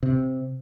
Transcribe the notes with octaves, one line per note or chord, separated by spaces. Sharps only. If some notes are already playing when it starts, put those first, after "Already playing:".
C3